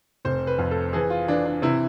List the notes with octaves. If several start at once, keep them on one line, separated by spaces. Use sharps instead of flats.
F1 C5
B4
F2
A4
E3 G#4
F4
E3 D4
D4
C3 E4